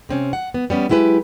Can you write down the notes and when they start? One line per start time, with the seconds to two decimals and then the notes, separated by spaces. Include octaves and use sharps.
0.09 C3 C4 C#4
0.33 F#5
0.54 B3
0.70 G3 B3 C#4
0.89 F#3 G#3 E4 G4 B4